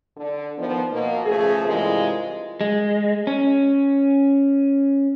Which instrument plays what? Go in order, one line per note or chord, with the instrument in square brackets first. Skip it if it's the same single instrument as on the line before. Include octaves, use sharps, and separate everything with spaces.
[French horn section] D3
D#3 F3 B3
B2 A#3
C#3 F3 A3 G#4
G2 C3 E3 G#3 F4 A#4
[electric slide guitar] G#3
C#4